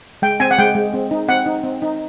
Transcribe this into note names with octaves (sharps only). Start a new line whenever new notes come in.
G#3 G5
C4 G#5
F#5
G#3 G5
G#3
C4
D#4
C4 F#5
D#4
C4
D#4